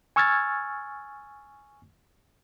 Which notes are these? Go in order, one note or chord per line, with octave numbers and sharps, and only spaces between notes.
G#5 C#6 E6 F6 G#6 A6